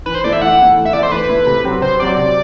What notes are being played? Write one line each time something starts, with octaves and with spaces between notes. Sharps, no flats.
E3 B4
C5
A3 E4 D5
E5
E3 F#5
A3 E4
E3
E5
A3 E4 D5
C5
E3 B4
A3 E4
C3
F#3 C4 G4
C3 C5
F#3 C4 G4 D5
C3 D5